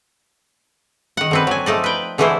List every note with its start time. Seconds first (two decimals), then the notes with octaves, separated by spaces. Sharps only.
1.17 D#3 F#5
1.31 D3 C4 B4
1.47 F#3 G#5
1.66 F3 A3 D#4 D5
1.84 B4 G5
2.18 D3 E3 G#3 A3 E4 C5